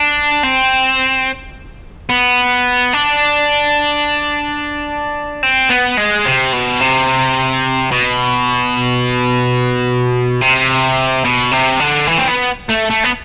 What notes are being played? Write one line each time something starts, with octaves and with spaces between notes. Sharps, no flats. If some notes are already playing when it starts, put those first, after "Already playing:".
Already playing: D4
C4
B3
D4
C4
B3
G#3
C3
B2
C3
B2
C3
B2
C3
D3
E3
C4
B3
A3
A3
B3